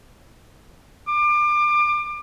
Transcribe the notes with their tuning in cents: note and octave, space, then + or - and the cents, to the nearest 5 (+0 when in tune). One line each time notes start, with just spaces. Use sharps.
D6 +30